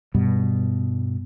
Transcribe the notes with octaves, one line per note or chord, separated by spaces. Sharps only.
G2 B2 G3